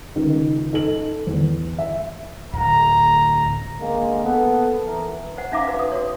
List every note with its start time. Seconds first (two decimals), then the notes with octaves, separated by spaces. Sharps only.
0.15 C#2 D#3
0.73 D#4 A4 F#7
1.27 E2
1.78 E5
2.53 D1 A#5
3.80 D3 G#3 A#3
4.24 B3 A4
4.85 E3 A#4
5.37 C5 F#5
5.52 C#4 D#4 E5 F5 A#5 D6
5.67 F#4 B4
5.79 D#6
5.92 F#4 C#5